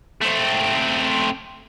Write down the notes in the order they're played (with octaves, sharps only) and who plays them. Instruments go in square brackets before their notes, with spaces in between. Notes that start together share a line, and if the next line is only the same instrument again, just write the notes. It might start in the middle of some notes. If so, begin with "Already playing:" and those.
[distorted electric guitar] A3 C4